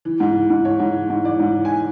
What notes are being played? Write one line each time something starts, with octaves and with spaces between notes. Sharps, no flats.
E3
G#2
E3
G#2
E3 C#5
G#2
E3
G#2
E3 D5
G#2
E3
G#5